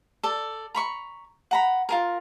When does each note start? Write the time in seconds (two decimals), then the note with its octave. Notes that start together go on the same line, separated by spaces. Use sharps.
0.23 A4 D5
0.75 A#5 B5 C#6
1.51 F#5 A#5 B5
1.89 F4 G#4 A#4